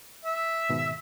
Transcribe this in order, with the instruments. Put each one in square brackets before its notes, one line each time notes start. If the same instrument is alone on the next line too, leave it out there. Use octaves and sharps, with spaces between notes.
[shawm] E5
[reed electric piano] G#2 B2 D#3